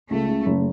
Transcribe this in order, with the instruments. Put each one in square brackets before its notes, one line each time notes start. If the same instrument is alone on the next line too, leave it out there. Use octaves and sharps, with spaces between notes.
[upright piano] C#2 [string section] A3
[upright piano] C#3
F#1